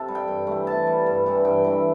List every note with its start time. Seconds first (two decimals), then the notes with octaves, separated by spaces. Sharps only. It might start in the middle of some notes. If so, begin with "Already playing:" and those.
Already playing: C3 A4
0.08 G3
0.15 G5
0.28 G2
0.47 E3 A3
0.67 C3 A5
0.87 G3
1.06 G2
1.26 E3 G3
1.45 G2 G5
1.65 E3 A3